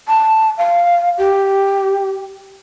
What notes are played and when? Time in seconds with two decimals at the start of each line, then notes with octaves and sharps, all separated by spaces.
0.08 A5
0.58 F5
1.18 G4